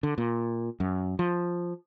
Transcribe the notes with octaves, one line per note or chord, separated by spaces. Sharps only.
D3
A#2
F#2
F3